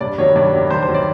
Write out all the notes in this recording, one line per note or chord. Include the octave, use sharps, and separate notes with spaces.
G2 D5
D#3 F#3 C#5
G2 D5
D#3 F#3
G2 C5
C5
D#3 F#3
D5